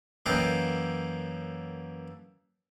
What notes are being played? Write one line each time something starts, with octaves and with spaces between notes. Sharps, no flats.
F#2 E3 A#3 A4 D#5 G5